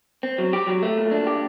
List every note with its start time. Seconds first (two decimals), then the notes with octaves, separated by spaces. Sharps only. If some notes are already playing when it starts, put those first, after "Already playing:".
0.23 C4
0.38 F#3
0.53 G4
0.67 F#3
0.83 A3
0.98 A#2
1.11 D4
1.27 G4